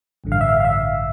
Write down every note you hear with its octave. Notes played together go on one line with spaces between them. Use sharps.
A1 G2 D3
F5
E5
F5
F5
E5